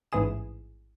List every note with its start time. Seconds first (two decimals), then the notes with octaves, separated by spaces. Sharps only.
0.12 A1 G#2 E3 E4 G#4 E7